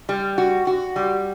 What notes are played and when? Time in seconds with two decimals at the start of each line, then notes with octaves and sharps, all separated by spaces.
0.09 G3
0.38 F#4
0.67 F#4
0.96 G3